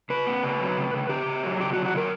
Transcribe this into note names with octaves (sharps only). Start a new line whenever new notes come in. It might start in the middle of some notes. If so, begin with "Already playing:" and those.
C#3 B4
A#3
C#3
F#3
C#3
C#3
C#3 G4
C#3
F#3
C#3 G4
F#3 F#4
F#4
C#3 A#4